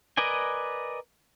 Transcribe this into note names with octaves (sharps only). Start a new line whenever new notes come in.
A#4 B4 D5 D#5 G#5